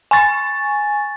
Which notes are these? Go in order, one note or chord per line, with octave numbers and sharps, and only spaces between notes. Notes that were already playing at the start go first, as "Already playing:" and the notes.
G#5 C#6 A6